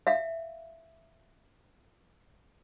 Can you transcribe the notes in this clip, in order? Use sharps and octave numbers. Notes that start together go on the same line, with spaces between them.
E5 F5